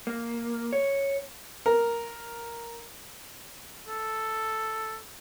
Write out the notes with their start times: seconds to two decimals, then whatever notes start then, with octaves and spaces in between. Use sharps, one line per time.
0.07 A#3
0.73 C#5
1.66 A#4
3.88 A4